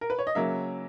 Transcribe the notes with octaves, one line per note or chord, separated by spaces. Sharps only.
A#4
B4
C#5
D#5
C#3 F#3 A#3 C#4 E5